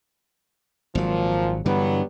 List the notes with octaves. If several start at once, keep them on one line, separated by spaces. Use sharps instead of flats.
G#1 A#2 F3 F#3
G2 D3 E3 F#3 G3 B3